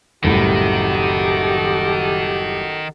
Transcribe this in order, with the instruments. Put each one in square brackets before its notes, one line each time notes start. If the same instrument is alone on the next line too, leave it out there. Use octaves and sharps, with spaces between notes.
[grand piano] F#1 C2 A2 [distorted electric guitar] D#3 [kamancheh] F#4 A4 [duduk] G4